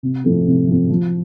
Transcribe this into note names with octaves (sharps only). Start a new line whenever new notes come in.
C3
F3 A3 C4
C3
F3 A3 C4
F3